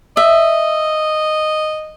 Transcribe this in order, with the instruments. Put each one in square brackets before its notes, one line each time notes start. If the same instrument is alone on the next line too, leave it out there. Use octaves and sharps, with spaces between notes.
[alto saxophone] D#5 [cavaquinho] E5